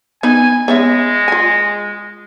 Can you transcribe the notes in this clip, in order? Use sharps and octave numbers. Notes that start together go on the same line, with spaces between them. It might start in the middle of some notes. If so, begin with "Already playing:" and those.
B3 D#4 G#5 B5
G#3 B3 C#4 E5
F4 G#5